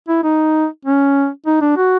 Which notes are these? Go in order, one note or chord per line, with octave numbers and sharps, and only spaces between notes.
E4
D#4
C#4
D#4
D4
F#4